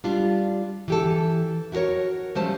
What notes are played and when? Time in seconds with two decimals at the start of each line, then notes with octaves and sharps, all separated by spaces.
0.04 G3 D4 F4
0.88 E3 G4 A4
1.72 E4 F#4 G4 A#4 C#5
2.35 F3 G3 A3 C#4 C5 A5